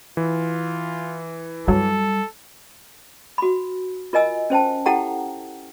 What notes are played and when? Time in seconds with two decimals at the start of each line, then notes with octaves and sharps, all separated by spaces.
0.17 E3 F4
1.68 G2 F#3 G3 A4
3.38 F#4 B5
4.13 F4 A#4 D#5 G#5 E6
4.50 C#4 C5 G5 A5
4.86 E4 G4 A4 F#5 G5 A#5